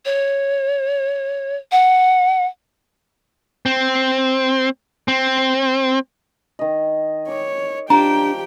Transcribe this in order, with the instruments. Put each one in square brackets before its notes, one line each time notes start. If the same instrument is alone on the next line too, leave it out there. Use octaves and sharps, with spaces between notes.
[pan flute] C#5
F#5
[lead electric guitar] C4
C4
[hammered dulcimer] D#3 D#5
[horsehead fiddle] C#5 [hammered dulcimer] D6
[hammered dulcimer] F3 [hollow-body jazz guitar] D4 [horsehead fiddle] G4 G5 [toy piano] A#5